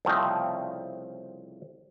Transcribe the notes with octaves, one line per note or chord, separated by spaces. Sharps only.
C2 C#3 F3 A3 C4 D#5